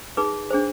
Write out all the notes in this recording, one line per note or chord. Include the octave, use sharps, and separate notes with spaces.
D#4 G#4 B4 D6
D4 G#4 C5